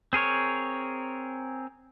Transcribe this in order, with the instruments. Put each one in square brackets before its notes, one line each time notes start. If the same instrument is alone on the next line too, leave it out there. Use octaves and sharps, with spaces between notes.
[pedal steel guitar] C4 G#4 A#4 C#5